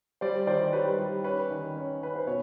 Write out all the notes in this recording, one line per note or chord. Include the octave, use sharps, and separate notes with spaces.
G3 C5 D5
D#3 C5 D5
D5
G3 B4 C#5
G3
C#4 B4 C#5
D#3
C#4
C#4 B4
C5
B2 C#5